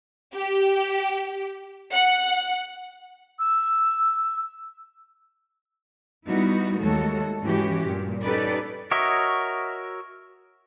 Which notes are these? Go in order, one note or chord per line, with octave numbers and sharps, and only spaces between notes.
G4
F#5
E6
G3 B3 D#4 E4 F#4
D#2 G#3 A3 F#4 A4 C#5
G#2 E3 G#3 C#4 F#4 G4
G2 A#2
C#4 D#4 G4 A4 B4 D5
F#4 A#4 C#5 D#5 E5